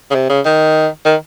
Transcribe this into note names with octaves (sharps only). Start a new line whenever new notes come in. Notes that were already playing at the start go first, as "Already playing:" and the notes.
C#3
C3
C#3
D#3
D#3